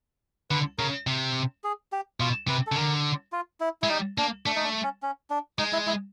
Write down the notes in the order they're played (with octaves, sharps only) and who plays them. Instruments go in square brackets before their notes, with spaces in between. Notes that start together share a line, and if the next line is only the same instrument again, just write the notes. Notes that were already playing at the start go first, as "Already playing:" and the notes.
[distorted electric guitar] D3 [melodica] B4
[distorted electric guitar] C#3 [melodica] A#4
[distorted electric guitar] C3
[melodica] G#4
G4
[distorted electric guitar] B2 [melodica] F4
[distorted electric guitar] C3 [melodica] B4
[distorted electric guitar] C#3 [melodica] A4
[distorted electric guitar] D3 [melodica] A#4
[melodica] F4
E4
[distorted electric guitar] G#3 [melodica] E4
[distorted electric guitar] G3 [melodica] D#4
[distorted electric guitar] A#3 [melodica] D4
[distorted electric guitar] A3 [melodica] D4
[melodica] D#4
D4
C#4
C#4
D4
[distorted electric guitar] G#3 [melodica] D#4
[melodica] E4
E4